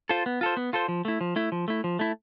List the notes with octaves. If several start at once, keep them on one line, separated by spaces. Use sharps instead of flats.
F4 A4 C5
B3
F4 A4 C5
B3
F4 A4 C5
F3
A3 E4
F3
A3 E4
F3
A3 E4
F3
A3 E4